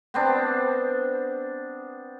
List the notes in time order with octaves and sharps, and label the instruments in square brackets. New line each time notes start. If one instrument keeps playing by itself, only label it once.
[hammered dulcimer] B3 C4 D4